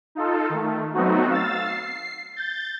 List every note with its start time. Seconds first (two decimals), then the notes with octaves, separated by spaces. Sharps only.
0.15 D#4 F4 A4
0.50 D#3 A3
0.93 F#3 A3 B3 C4 D#4 F#4
1.29 F5 E6 A6
1.65 C7
2.36 G6 A6